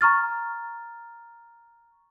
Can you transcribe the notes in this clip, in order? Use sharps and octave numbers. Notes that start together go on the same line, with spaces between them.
A#5 C#6 F6 A6